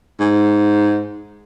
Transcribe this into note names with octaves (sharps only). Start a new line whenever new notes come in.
G#2